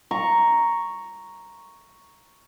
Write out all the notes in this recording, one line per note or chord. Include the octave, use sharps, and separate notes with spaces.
A#5 C#6